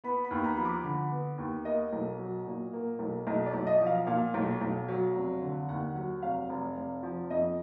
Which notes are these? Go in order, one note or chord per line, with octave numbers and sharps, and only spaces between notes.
B3 B5
B5
D#2
A#5
F3 B5
D6
D3 B5
B3
D#2
A#3 D#5
B1
F#3
A#2
A#3
B1
B1 D#5
D5
B1
D#5
F3
F5
A#2 F5
B1
B1
F#3
F1
D3
D#2 F#5
F#3 F#5
F1 F5
F1
F1
F3
F2 D#5